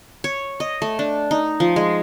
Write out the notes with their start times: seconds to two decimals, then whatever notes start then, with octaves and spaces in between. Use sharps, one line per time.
0.24 C#5
0.60 D#5
0.82 A3
0.99 D4
1.31 D#4
1.60 F3
1.76 G#3